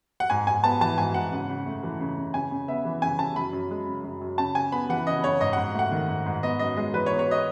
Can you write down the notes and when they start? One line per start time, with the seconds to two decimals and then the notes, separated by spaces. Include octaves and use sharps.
0.20 F#5
0.30 G#2 G#5
0.47 G#2 G#5
0.64 B3 A5
0.81 E3 A5
0.98 G#2 G#5
1.14 G#2 F#5
1.32 C#3
1.50 C#3
1.66 A3
1.83 E3
2.00 C#3
2.17 C#3
2.34 C#3 G#5
2.51 C#3
2.68 B3 E5
2.85 E3
3.02 C#3 G#5
3.19 C#3 A5
3.36 F#2 B5
3.53 F#2
3.71 G#3
3.88 C#3
4.04 F#2
4.21 F#2
4.38 C#3 A5
4.55 C#3 G#5
4.72 B3 B5
4.89 E3 F#5
5.07 C#3 D#5
5.24 C#3 C#5
5.40 G#2 D#5
5.53 G#2 F#5
5.75 A3 F#5
5.91 D#3
6.08 G#2
6.26 G#2
6.43 B3 D#5
6.59 F#2 D#5
6.77 G#3 D#5
6.94 E3 B4
7.06 C#5
7.10 B3
7.19 C#5
7.31 D#5